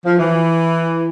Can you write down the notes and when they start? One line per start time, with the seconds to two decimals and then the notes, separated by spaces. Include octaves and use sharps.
0.06 F3
0.17 E3